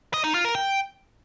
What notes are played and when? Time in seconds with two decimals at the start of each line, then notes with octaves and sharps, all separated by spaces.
0.14 D#5
0.24 D#4
0.34 F4
0.45 A#4
0.55 G5